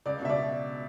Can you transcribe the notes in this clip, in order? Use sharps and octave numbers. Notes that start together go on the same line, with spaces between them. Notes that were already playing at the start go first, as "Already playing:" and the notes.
C#2 D5
B2 E5
D5